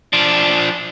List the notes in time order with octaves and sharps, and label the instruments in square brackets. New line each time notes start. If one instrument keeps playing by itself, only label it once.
[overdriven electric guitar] F3 D4